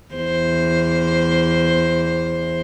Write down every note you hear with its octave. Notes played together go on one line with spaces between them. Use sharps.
E2 C5